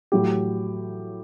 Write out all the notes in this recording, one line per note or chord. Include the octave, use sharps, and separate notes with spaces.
A2 F#3 G4